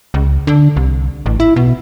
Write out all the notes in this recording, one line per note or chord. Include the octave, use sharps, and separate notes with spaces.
C#2
D3
C2
A1
E4
B2